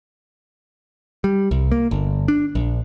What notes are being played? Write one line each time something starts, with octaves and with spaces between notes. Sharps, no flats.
G3
C2
A#3
G1
D4
A#1